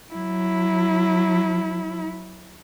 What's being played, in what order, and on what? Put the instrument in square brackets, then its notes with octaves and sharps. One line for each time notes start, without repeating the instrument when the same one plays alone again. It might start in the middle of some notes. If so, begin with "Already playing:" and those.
[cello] F#3 E4